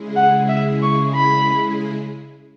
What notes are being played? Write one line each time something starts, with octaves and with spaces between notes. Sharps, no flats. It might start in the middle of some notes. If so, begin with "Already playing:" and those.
Already playing: C#3 G#3 E4 G#4
F#5
E5
C#6
B5